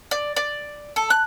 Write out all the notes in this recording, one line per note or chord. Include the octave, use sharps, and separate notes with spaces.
D5
D5
A4
F#6